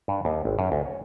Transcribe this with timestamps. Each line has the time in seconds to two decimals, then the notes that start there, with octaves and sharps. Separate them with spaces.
0.08 G2
0.25 D#2
0.45 G#1
0.59 F#2
0.72 D2
0.86 C#5